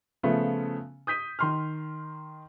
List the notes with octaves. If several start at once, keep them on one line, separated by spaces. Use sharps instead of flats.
C#3 F3 A3 B3 F4
D#6 G6 B6 D#7
D#3 C6 F6